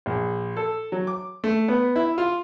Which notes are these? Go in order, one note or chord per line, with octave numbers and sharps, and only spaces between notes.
A#1
A4
F#3
D6
A3
B3
E4
F4